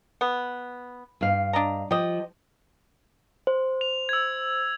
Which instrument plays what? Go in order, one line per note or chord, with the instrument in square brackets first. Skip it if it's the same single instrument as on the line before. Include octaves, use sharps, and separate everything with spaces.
[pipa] B3
[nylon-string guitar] G2 F5
[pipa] D4 D#5 A#5
[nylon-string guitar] F3 [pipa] G4 D#5
[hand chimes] C5
[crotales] F7
E6 G#6